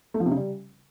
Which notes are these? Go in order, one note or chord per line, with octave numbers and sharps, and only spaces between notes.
A3
F3
C3
C#3
G3